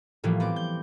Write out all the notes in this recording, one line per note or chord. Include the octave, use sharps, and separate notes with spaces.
A2 E3 F3 G3 A#3
B3 C4 D6
G6